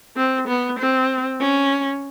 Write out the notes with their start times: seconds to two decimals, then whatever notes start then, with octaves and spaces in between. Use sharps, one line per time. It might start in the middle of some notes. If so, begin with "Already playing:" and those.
0.17 C4
0.48 B3
0.79 C4
1.41 C#4